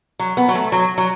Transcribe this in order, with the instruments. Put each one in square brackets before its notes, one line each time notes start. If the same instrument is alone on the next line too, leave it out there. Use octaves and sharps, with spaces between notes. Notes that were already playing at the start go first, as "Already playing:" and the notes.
[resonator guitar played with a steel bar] F#3
B3
F#3
A3
F#3
F#3